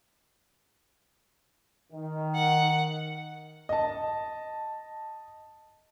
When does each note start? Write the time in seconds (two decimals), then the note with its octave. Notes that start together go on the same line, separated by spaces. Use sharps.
1.92 D#3
2.34 F#5
3.69 D#5 A5